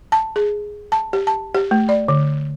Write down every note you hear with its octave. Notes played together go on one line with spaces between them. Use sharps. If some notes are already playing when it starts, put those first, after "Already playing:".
A5
G#4
A5
G4
A5
G4
A3
D5
D3